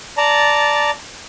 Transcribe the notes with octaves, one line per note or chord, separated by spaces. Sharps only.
D5 A5 A#5